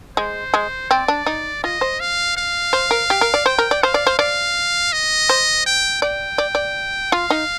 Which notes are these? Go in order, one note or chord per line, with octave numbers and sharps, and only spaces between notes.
G#3 C5
G#3
C4 D5
D4
D#4
F4 D#5
C5
F5
F5
C5
A#4
G4
A#4
D5
C5 G5
A#4
D5
C5 F5
D5
C5
D5 F5
D#5
C5
G5
D5 G5
D5
D5
F4 F5
D#4